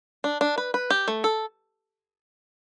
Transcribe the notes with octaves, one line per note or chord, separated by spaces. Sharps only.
D4
D4
B4
B4
G4
A3
A4